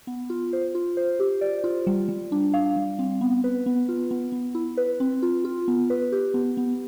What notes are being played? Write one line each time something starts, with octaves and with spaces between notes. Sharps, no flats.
B3
F4
C5
F4
C5
G4
D5
F4
G3
G3
D4
F5
G3
C4
B3
B4
B3
F4
B3
B3
E4
B4
C4
F4
F4
B3
B4
G4
B3
B3